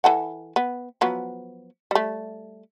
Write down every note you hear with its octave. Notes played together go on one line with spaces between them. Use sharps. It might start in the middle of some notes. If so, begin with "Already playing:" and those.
E3 A4 F#5
B3
F3 F#3 B3
G3 A3